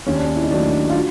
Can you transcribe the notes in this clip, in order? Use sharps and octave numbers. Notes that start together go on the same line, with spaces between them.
D#2 C#4
D4
C#4
E4
D#4
D#3 F#3 A3 D4
F4
F#4